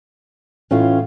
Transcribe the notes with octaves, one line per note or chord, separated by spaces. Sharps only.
A2 E3 A3 C#4 F4